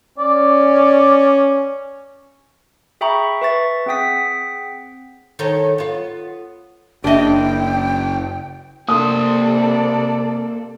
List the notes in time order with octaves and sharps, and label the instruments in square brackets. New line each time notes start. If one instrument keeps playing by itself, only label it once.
[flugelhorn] C#4 [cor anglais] D5
[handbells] G#4 E5 G5 A#5 B5 C#6
B4 E5 C#6 A6
C4 G#4 F#5 G5 D#6 B6
[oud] D#3 A4 C#5
B3 F4
[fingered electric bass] F#1 [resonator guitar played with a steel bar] D4 D#5 [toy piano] G#4 E5 [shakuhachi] G5
[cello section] C3 [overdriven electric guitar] A#3 C5 [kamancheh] A4 D5 [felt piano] D#6